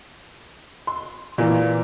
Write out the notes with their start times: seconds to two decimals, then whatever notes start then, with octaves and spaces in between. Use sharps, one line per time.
0.87 C6
1.38 A#2 E3